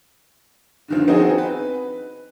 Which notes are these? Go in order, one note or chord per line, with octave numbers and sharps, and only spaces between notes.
D3 D#3 F3
B3 C4 D#4 F#4 G#4
B4